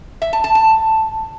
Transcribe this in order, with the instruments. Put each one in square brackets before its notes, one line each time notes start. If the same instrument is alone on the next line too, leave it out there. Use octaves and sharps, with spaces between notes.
[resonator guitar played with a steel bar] E5
A5
A5
A5